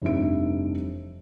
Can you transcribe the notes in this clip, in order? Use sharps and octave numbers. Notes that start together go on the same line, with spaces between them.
F1 G2 E3 D#4 E5 D7